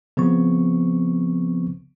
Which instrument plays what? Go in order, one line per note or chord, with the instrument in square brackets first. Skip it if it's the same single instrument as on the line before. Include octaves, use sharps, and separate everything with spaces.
[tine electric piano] C#3 F3 B3 C4 C#6